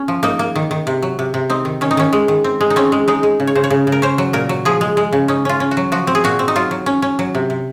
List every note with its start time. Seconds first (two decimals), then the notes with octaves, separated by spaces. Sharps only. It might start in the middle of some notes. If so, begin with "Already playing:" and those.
Already playing: C#4
0.08 F3
0.23 A#3 D#4
0.39 A#3
0.56 D#3
0.71 D#3
0.87 C3
1.02 F#3
1.19 C3
1.34 C3
1.50 C4 D#4
1.65 D#3
1.81 D#3 C#4
1.91 D#4
1.97 D#3 C#4
2.13 G#3
2.28 D#3
2.44 C4
2.61 G#3
2.70 D#4
2.76 C4 C#4
2.92 G#3
3.08 G#3 D#4
3.23 G#3
3.40 C#3
3.47 C#5
3.55 C#3 C5
3.64 C#5
3.70 C#3
3.87 C#3
3.92 A#4
4.02 C#4 C5
4.18 F#3
4.33 A#2 A#4
4.49 F#3
4.65 F3 G#4
4.81 G#3
4.97 G#3
5.12 C#3
5.28 C#4 D#4
5.45 C#4 F4
5.60 C#4
5.71 F#4
5.77 F#3
5.92 F3 F#4
6.07 C4
6.15 G#4
6.24 A#2 F#4
6.39 C4
6.48 D#4
6.56 F#3 F4
6.71 F#3
6.86 C#4
7.02 C#4
7.19 F#3
7.35 C3
7.50 C3